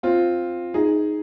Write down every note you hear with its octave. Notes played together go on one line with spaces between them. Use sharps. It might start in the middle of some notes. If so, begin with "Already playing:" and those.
C4 F4
D#4 G#4